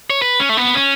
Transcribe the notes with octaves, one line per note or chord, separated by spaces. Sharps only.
C#5
B4
C#4
A3
B3
C#4